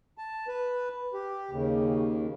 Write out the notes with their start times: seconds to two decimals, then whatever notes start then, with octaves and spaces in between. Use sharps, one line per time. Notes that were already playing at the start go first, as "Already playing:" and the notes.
0.18 A5
0.48 B4
1.13 G4
1.51 D#2 C#3